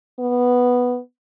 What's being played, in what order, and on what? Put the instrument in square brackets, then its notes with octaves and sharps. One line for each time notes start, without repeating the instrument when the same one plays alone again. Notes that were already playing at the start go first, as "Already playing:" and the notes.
[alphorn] B3